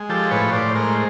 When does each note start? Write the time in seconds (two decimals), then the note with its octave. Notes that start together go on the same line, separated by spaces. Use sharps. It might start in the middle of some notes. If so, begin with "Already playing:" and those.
Already playing: G#3
0.09 F3 G4 A4
0.31 A2 B4 C#5
0.53 A2 C5 D5
0.74 G#3 A#4 C5